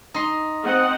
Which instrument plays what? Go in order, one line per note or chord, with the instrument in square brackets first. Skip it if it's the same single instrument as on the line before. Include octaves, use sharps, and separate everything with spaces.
[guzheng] D#4 C6
[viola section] C4 D#5 F#5